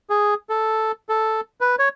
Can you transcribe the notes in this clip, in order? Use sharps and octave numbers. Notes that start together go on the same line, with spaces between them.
G#4
A4
A4
B4
C#5